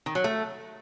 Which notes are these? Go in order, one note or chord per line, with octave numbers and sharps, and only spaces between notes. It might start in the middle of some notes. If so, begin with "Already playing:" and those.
D#3
F#3
A3